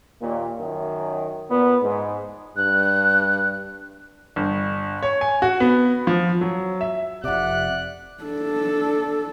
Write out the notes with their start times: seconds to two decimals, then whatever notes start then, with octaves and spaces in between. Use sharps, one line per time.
0.20 D#2 A#2
0.59 F#2 D#3
1.50 A#2 B3
1.82 G#2
2.57 G2 F#6
4.36 G1
5.03 C#5
5.21 G#5
5.42 F#4
5.60 B3
6.07 F3
6.41 F#3
6.81 E5
7.24 F1 C3 D5 E5 F#5 F#6
8.23 D4 A4